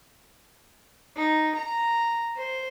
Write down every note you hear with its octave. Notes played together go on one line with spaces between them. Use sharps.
D#4
A#5
C5